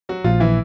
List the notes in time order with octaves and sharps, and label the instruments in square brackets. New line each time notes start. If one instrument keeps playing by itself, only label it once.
[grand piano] F#3 F#4
[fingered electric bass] A#1 [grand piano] F3 F4
[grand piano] E3 E4